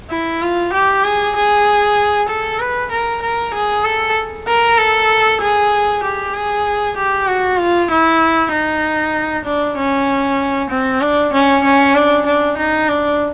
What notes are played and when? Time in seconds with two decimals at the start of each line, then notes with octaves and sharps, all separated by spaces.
0.10 E4
0.42 F4
0.73 G4
1.04 G#4
1.36 G#4
2.29 A4
2.59 B4
2.91 A#4
3.22 A#4
3.54 G#4
3.84 A4
4.47 A#4
4.78 A4
5.41 G#4
6.03 G4
6.34 G#4
6.97 G4
7.27 F#4
7.58 F4
7.90 E4
8.52 D#4
9.45 D4
9.77 C#4
10.70 C4
11.01 D4
11.33 C#4
11.64 C#4
11.95 D4
12.26 D4
12.57 D#4
12.88 D4